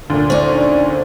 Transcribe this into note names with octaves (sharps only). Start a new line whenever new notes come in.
D2 A#2
C#4 D#4 C5 D5